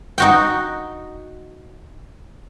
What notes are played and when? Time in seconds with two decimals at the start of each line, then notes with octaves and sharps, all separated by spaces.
0.18 D#4 F#4 G5